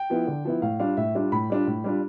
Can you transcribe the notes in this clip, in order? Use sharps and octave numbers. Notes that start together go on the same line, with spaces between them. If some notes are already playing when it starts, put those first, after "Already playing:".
Already playing: G5
F3 B3 E4
D3
F3 B3 E4
A2 F5
G3 D4 F4 F5
A2 E5
G3 D4 F4
A2 B5
G3 D4 F4
A2
G3 D4 F4